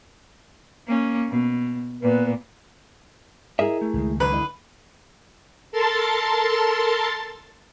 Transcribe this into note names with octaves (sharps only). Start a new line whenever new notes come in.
A#3 C#4
B2
A#2 B3 B4
E4 G#4 A#4 D#5 E5
A3
C#2 D#3 G#3
F#2 D3 F#3 B4 D#5 B5
E4 D#5
A4 A#4 A5 C6 A6